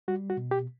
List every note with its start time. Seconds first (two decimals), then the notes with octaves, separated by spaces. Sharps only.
0.08 G3 F#4
0.30 F#4
0.37 B2
0.51 G4